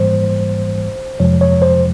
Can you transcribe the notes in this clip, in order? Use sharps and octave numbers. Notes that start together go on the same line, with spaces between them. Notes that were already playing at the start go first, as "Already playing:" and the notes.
Already playing: G#2 E3 G3 A#3 C5
F2 C3 F3 G#3 C#5
C#5
C5